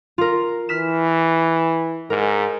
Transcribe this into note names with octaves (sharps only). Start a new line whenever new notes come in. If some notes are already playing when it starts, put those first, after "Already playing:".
F4 A#4
E3 F6 B6 E7
G#2 A#4